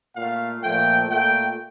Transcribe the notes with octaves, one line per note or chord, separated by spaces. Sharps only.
A#2 A3 F5
A#2 F3 A3 G5
A#2 A3 G5